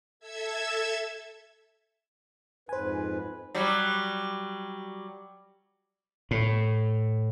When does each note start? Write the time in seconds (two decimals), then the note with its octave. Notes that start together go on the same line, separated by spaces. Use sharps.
0.20 A4 E5 E6 G#6
2.69 F2 G#2 B4 C5 G#5
3.55 F#3 G3
6.31 A2